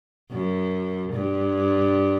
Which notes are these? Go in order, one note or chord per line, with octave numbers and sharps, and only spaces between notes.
F#2
G2